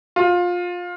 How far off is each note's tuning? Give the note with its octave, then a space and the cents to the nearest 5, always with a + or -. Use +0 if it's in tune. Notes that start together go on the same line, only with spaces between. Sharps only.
F4 +20